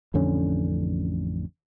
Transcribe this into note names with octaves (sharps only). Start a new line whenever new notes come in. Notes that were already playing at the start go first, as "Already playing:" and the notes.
A1 F2 D3 C#4